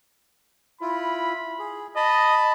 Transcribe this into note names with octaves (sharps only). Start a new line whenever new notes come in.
E4 F4 B5
G#4
D#5 A5 B5